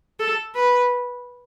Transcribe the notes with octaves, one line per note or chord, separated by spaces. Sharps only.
A4
B4